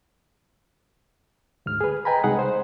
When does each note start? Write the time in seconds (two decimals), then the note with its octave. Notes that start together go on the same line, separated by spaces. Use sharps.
1.66 D2 G#2 F6
1.81 G#4 B4
2.05 B4 D#5 G5 G#5 A#5 B5
2.24 C2 G#3 D#4 G#4 F#5
2.39 C5